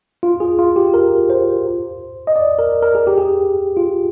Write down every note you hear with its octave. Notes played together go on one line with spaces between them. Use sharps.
F4
G#4
F4
G4
A#4
C5
D#5
D5
A#4
A#4
G#4
G4
G#4
F4